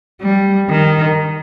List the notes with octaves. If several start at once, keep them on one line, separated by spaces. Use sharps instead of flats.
G3
D#3